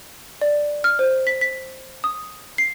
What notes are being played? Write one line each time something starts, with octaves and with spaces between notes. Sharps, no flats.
D5
F6
C5
B6
B6
D#6
C7